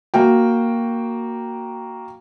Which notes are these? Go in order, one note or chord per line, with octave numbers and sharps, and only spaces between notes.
A#3 F#4 G5